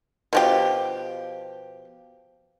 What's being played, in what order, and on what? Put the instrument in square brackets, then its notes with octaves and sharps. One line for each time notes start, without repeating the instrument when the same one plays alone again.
[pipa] B2 F3 G4